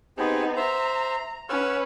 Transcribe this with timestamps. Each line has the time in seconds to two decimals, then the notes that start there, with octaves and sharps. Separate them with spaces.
0.18 B3 C4 D#4 G4 G#4
0.56 C5 E5 A#5
1.49 C#4 B4 F#5 E6 F6